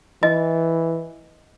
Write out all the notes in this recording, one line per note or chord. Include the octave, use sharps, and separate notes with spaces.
E3 D#5